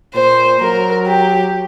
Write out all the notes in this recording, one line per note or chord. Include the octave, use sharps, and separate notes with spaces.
A#2 C5
F#3 A#4
G4